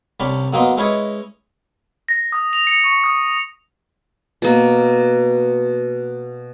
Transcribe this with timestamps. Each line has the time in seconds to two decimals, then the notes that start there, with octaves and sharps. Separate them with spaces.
0.20 C2 C#4 D4 B5
0.53 F#2 A#3 B3 B4 D#5 C6
0.77 G#3 C#4 E4 B4 C#5 D#5
2.08 A#6
2.32 D#6
2.53 F7
2.67 C#7
2.84 C#6
3.04 D#6
4.42 B2 A#3